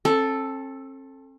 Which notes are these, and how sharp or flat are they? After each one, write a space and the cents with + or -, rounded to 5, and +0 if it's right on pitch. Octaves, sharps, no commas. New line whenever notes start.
C4 +45 A4 +0